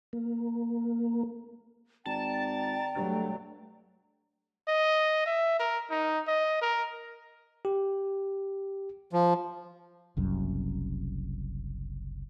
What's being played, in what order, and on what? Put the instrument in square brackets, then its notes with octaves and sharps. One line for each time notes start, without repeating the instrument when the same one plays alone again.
[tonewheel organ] A#3
[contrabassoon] G#1 [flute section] D5 G5 A#5 [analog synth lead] A5
[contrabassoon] G2 [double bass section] F#3 G#3 A3
[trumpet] D#5
E5
A#4
D#4
D#5
A#4
[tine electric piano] G4
[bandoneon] F3
[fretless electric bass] F#1 C2 F#2